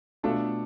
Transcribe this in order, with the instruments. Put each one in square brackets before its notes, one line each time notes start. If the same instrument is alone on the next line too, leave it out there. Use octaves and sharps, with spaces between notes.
[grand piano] B2 A3 D4 F4 A4